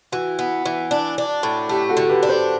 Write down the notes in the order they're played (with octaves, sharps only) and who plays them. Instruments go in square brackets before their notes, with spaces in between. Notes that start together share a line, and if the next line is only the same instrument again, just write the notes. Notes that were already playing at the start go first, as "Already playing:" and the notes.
[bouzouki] E3 [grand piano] F#4
[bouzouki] B3
E3
D4
D4
A2
[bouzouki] A3 [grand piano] G4
[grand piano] F#4 A4
[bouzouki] D3
[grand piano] G4 B4
[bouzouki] D4
[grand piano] A4 C5